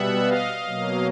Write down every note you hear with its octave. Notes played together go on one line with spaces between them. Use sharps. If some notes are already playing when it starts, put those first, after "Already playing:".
Already playing: B2 G3 B3 E5 F#5
D#5 F5
B2 F#3 A#3